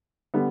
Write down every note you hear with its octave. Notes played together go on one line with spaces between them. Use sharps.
D3 G3 B3